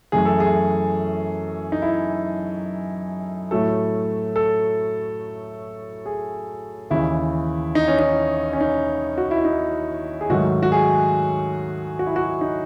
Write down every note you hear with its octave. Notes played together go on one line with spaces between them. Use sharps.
F#2 E3 A3 G#4
A4
G#4
D#4
E4
A2 F#3 A3 A4
A4
G#4
D#2 C#3 E3 E4
D#4
C#4
D#4
C#4
D#4
F#4
E4
D#4
G#4
G#2 D#3 F#3 A3 F#4
F#4
G#4
F#4
E4
F#4
D#4